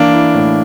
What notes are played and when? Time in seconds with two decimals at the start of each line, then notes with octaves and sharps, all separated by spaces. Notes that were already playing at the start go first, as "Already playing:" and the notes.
Already playing: E3 A#3 D4
0.13 E4
0.34 A2